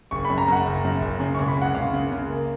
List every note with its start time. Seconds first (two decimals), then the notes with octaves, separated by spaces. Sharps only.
0.11 F#1 C#6
0.25 F#2 B5
0.38 A#5
0.48 F#2 F#5
0.66 F#1
0.84 F#2
1.02 F#1
1.20 C#3
1.35 C#2 C#6
1.48 B5
1.57 C#3 F#5
1.75 C#2 F5
1.93 C#3
2.12 C#3
2.30 A#3